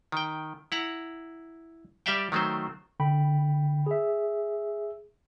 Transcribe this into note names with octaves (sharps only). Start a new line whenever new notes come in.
D#3 G5
E4 F#5 A#5
G3 G4 D5 E5 F5 G5
D#3 F#3 A3 C4 C5
D3 G5 B5
G#4 E5